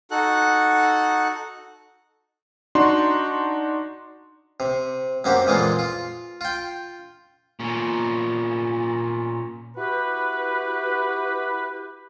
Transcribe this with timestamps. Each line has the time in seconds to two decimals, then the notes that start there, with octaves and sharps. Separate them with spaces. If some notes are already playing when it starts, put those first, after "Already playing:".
0.11 D#4 F#4 A4 F#5 F#6
2.75 D4 D#4 F#4 C6
4.60 C3
5.24 F#2 A#3 C4 F#4 G4
5.46 F2 A#2 E3 G#3 A#3 F4
5.79 F4
6.41 F4 G5
7.60 A#2 C#4
9.77 E4 F#4 G4 B4